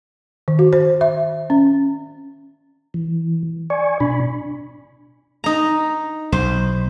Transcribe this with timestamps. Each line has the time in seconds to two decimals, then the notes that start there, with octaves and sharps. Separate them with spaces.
0.48 D#3
0.59 F#4
0.73 C5
1.01 E5
1.50 C#4
2.94 E3
3.70 D5 G#5 C#6
4.00 B2 D4 B5
5.44 D#4 A#5
6.32 B1 C5